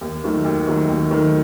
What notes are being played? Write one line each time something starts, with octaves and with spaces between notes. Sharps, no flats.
D#2
D#3 F#3 A3
D#2
D#3 F#3 A3
D#2
D#3 F#3 A3